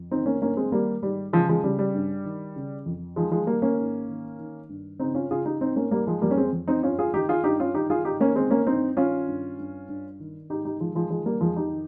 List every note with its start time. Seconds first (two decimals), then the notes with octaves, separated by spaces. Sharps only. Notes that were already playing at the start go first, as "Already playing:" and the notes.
Already playing: F2
0.11 D#3 C4 D#4
0.26 A#3 C#4
0.41 G2 A#3 C#4
0.57 G#3 C4
0.72 D#3 G3 A#3
1.02 G#2 G3
1.33 C#3 F3 G#3
1.49 F3 G#3
1.64 C#3 G3
1.79 G3
1.94 G2
2.25 D#3
2.56 C#3
2.86 F2
3.16 D#3 F3 G#3
3.31 F3 G#3
3.47 D#3 G3 A#3
3.62 A#3 C#4
3.78 G#2
4.08 D#3
4.39 D#3
4.69 G2
4.99 C#3 C4 D#4
5.15 C#4 F4
5.30 C#3 F4 G#4
5.45 D#4 G4
5.61 G#2 C4 D#4
5.76 A#3 C#4
5.91 G#2 G3 A#3
6.07 F3 G#3
6.22 F2 G3 A#3
6.31 C#4
6.37 G#3 C4
6.52 F2
6.68 C4 D#4
6.83 G2 C#4 F4
6.99 F4 G#4
7.13 D#3 D#4 G4
7.29 F4 G#4
7.44 G2 D#4 G4
7.60 C#4 F4
7.74 D#3 D#4 G4
7.90 F4 G#4
8.05 G#2 D#4 G4
8.20 A#3 C#4
8.35 D#3 G#3 C4
8.50 A#3 C#4
8.67 G2 C4 D#4
8.97 D#3 C#4 F4
9.28 G2
9.58 G2
9.89 G2
10.20 D#3
10.50 G#2 D#4 G4
10.65 D#4 G4
10.80 D#3 F3 G#3
10.95 F3 G#3
11.10 D#3 F3 G#3
11.26 G3 A#3
11.41 F2 F3 G#3
11.56 D#4 G4
11.72 D#3